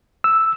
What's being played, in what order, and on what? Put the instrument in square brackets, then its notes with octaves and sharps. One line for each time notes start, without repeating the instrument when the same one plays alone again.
[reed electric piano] E6